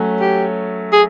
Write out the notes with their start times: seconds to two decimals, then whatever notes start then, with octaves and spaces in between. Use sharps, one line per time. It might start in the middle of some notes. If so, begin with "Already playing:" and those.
Already playing: F#3 A3 C#4
0.21 G4
0.93 G#4